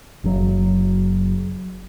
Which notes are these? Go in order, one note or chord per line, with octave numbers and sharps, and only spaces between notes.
F#1 F#3